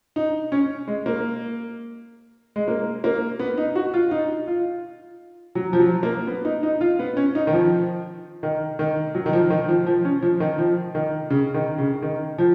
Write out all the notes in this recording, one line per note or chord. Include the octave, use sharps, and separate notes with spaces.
D#4
C#4
G#3
A#3
G#3
A#3
A#3
B3
D#4
F#4
F4
D#4
F4
F#3
F3
F#3
A#3
B3
D#4
D#4
F4
B3
C#4
D#4
D#3
F3
D#3
D#3
F#3
D#3
F3
D#3
F3
F3
C#4
F3
D#3
F3
D#3
C#3
D#3
C#3
D#3
F3